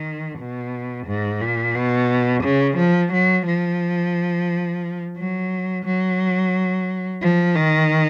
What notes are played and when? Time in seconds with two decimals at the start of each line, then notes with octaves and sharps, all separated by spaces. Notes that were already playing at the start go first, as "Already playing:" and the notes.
Already playing: D#3
0.38 B2
1.07 G#2
1.41 A#2
1.75 B2
2.43 C#3
2.77 F3
3.12 F#3
3.46 F3
5.16 F#3
5.85 F#3
7.22 F3
7.56 D#3